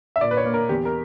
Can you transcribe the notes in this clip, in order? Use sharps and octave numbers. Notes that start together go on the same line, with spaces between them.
E5
A#2 D5
B4
C#5
A#3
A#4
E2 G4
A#4